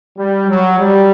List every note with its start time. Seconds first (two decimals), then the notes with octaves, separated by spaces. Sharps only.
0.17 G3
0.47 F#3
0.78 G3